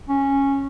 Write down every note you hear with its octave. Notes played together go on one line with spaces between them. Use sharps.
C#4